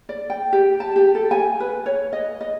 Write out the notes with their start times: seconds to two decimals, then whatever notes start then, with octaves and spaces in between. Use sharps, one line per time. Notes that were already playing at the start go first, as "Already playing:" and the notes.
0.09 D5
0.30 G5
0.53 G4
0.80 A5
0.96 G4
1.15 A4
1.31 G#5
1.60 B4
1.86 C#5
2.13 D#5
2.41 D#5